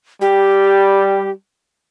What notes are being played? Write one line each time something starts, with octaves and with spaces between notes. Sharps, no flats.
G3 G4